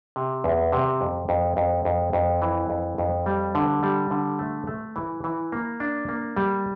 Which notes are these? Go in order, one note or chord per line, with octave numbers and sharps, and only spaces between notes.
C3
E2
C3
F2
F2
F2
F2
F2
E3
F2
F2
G3
D3
G3
D3
A3
A3
E3
E3
A#3
D4
A#3
G3